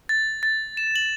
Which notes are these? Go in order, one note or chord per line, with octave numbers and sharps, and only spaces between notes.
A6
A6
E7
F#7